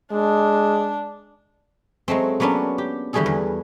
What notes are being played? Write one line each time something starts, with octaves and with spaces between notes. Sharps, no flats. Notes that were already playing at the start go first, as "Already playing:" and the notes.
G#3 D4
F#3 G#3 A3 C4
F#3 A#3 B3 C#4 D4
G4
D3 E3 G3 F#4 G#4 A4
E2